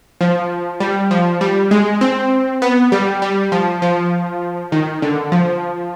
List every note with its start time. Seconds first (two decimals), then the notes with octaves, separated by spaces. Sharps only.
0.21 F3
0.80 G3
1.11 F3
1.41 G3
1.71 G#3
2.01 C4
2.62 B3
2.92 G3
3.22 G3
3.52 F3
3.82 F3
4.72 D#3
5.02 D3
5.32 F3